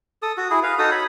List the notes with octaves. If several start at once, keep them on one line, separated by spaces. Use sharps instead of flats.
A4 D#6
F#4
E4 G#4
B4 F5
D#4 F#4 A4 D#6
C#5 B5